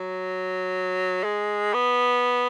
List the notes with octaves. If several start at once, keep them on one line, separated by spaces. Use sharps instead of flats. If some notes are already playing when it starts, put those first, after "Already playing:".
Already playing: F#3
G#3
B3